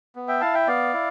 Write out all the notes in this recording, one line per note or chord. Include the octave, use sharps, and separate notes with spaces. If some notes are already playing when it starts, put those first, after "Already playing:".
B3
E5 G5
E4 F5 A5
E5 G5
B3 D5 F5
E4